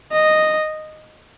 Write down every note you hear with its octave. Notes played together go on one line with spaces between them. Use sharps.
D#5